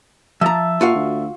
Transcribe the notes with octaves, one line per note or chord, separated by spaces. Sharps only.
F3 E5 A5 A#5
A#2 F4 F#4 F5
D2